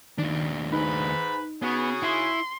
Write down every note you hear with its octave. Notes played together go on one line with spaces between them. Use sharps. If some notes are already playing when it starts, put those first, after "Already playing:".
D#2 D#3 D4
G#2 D#4 B4 B5
C#3 B3 F#4 G#4
E4 C6